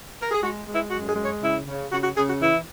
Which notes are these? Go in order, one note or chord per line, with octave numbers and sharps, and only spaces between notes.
A#4
G#4
G#3 F#4
G#3
E4
F#2 F#4
G#4
G#3
C#5
C#3 E4
C#3
C#3 F#4
F#4
C#3 G#4
F#4
E3 E4